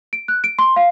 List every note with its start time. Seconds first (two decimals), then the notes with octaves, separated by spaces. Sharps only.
0.13 D7
0.28 F#6
0.44 D7
0.59 C6
0.76 F5